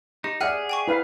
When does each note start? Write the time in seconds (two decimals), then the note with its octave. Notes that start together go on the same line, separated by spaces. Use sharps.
0.24 D#4 G4
0.41 G#4 D5 E5 F#5 F6 F#6 C#7
0.69 G5 G#5 C#6
0.88 E4 B4 F5